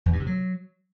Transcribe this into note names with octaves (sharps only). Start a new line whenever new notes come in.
E2
G2
C3
F#3